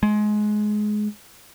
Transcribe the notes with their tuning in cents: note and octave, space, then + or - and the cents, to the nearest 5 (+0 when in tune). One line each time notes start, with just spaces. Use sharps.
G#3 +20